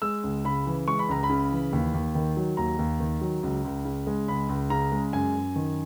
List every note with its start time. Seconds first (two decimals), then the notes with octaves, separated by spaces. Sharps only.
0.02 G#3 E6
0.24 C#2
0.44 C#3 B5
0.66 E3
0.87 G#3 C#6
0.99 B5
1.09 C#2 A#5
1.23 B5
1.30 C#3
1.52 E3
1.73 D#2
1.94 D#2
2.15 D#3
2.37 F#3
2.57 D#2 A#5
2.79 D#2
3.00 D#3
3.21 F#3
3.43 C#2
3.64 C#2
3.85 C#3
4.07 G#3
4.28 C#2 B5
4.49 C#2
4.70 C#3 A#5
4.92 G#3
5.13 F#2 G#5
5.35 F#2
5.56 D#3